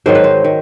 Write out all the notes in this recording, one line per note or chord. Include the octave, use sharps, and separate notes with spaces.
G#2 D#3 F#3 C5
B4
C5
D#3